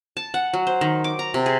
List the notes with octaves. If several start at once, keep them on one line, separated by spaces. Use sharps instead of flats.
A5
F#5
F#3
C5
D#3
D6
A#5
C3
G#4